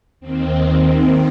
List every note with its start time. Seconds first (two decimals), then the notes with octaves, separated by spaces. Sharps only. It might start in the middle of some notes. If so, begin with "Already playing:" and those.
0.20 D#2 D#3 C4